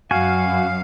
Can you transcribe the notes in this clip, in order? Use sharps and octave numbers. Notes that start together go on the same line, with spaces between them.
F#2 F#4 F5 G#5